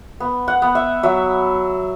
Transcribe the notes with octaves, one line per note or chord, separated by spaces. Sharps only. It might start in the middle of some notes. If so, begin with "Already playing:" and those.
B3
F#5
B3
E5
F#3 E5